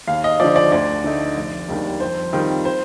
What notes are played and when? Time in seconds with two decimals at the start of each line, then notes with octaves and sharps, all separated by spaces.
0.07 D#2 F5
0.24 D#5
0.40 D3 F3 D5
0.56 D5
0.72 D2 D5
1.04 D3 A3 D#4
1.37 F1
1.68 D#2 D#3 G3 D4
2.00 F2 C5
2.33 D#3 G3 C4 F4
2.65 C5